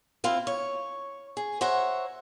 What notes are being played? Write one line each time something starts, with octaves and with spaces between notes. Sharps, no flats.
C4 E4 F4 C5
C#5
G#4
C5 C#5 E5 F#5 A#5